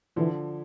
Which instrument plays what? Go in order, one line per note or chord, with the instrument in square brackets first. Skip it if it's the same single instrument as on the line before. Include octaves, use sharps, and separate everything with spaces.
[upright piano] D3 F3 [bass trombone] E3